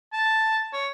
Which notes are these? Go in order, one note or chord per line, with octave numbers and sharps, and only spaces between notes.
A5
C#5